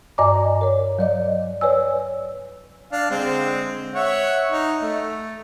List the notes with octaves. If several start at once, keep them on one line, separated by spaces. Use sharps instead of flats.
G2 D5 D#5 G#5 A#5 D6
A#4 C#5
F#3 D5 D#5
B4 C#5 D5 G#5 E6
D4 F5
D3 G#3 C4
C#5 E5 F#5
D#4
A3